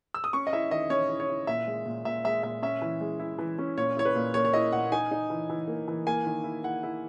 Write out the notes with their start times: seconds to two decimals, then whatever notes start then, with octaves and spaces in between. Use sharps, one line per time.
0.14 E6
0.24 D#6
0.33 C#4 C#6
0.47 D#5
0.53 E4 E5
0.71 D#3 D#5
0.90 C#4 C#5
1.09 E4
1.20 C#5
1.29 E4
1.47 A#2 E5
1.67 G#3
1.85 A#2
2.05 A#2 E5
2.24 G#3 E5
2.43 A#2 E5
2.62 C#4 E5
2.82 E3
3.01 G#3
3.20 E4
3.38 E3
3.58 C#4
3.77 A#2 C#5
3.97 E4 C#5
4.05 B4
4.15 A#2
4.34 A#3 C#5
4.45 C#5
4.54 E4 D#5
4.72 A#2 F#5
4.92 D#4 G#5
5.11 D#4
5.30 E3
5.50 E3
5.68 A#3
5.88 E3
6.07 A#3 G#5
6.26 D#3
6.44 E4
6.64 E4 F#5
6.83 E4